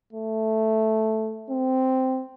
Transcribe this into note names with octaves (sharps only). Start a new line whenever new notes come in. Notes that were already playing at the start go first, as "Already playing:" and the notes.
A3
C4